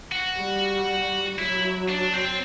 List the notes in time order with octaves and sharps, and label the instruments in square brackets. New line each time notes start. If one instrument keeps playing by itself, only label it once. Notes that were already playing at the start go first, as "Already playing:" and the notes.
[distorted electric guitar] F#4
[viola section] G3
[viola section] F#3 [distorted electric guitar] E4
[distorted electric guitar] D4
C4